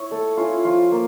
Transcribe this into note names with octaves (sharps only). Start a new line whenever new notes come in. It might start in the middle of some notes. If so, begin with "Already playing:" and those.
Already playing: E4 C#5
A3 A4
C#4 E4 F4
F3 F4
A#3